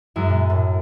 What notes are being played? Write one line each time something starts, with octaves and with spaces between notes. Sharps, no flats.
F#2 G#3 E4
A#2
A2